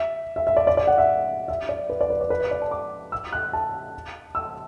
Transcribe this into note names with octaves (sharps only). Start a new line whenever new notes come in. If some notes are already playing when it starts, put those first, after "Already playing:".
Already playing: E5
E5
E5
D5
D5
D5
F#5
E5
E5
D5
B4
D5
B4
D5
B4
D5
D5
A5
D6
E6
F#6
A5
E6